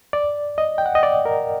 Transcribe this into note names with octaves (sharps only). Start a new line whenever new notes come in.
D5
D#5
G5
F#5
D#5
D5
A#4